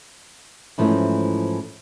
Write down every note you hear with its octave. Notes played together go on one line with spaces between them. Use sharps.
G#2 E3 F3 A3 C#4